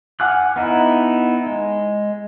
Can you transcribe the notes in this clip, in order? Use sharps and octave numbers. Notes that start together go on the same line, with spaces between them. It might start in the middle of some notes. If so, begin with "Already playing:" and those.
F#5 G#5 D6 F6 F#6
B3 D#4 E4
G#3